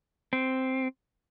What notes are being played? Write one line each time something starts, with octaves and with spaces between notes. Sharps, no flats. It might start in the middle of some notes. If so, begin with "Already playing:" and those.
C4